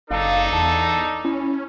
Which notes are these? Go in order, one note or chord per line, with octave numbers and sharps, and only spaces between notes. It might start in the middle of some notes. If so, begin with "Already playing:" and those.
F#1 D4 D#4 A4 F5
E2 A5
C#4 E4